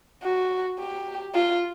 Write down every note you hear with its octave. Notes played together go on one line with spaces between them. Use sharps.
F#4
G4
F4